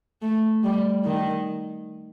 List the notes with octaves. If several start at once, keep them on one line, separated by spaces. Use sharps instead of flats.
A3
G3
D#3